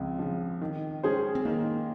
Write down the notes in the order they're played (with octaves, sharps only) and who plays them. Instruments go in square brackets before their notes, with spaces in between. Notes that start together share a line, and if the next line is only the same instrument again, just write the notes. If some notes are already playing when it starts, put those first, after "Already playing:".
Already playing: [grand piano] C#2 C#3 F3 [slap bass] C4
[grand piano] C#3 F3
D#3
G#3 C#4 G#4 C5
[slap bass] C4
[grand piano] D#3 [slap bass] A#3